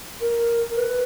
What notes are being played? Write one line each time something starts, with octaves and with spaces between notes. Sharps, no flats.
A#4
B4